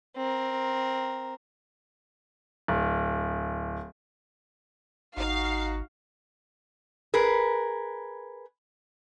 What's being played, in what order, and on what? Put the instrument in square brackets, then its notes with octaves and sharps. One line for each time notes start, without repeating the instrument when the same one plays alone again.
[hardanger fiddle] C4 A#4
[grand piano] D1
[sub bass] G#1 [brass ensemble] D#4 F#4 [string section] F5
[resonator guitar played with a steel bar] G#4 A#4 B4